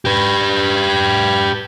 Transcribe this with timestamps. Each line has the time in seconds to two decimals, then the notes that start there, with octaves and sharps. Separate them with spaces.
0.05 G4 B4